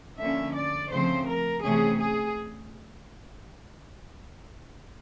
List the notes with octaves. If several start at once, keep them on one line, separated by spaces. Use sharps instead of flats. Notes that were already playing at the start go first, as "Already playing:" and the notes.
D3 F3 A#3 C#4 E5
D5
C#3 F3 A3 C4 C5
A#4
C3 E3 A3 C#4 G#4
G#4